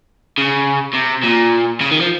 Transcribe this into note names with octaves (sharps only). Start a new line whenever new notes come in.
C#3
C3
A#2
C#3
D#3
F3